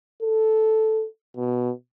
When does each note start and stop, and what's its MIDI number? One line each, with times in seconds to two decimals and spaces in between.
0.22 1.06 69
1.37 1.71 47